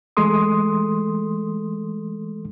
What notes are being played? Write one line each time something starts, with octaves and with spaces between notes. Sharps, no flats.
E3 G#3 A3 A4 C6 D#6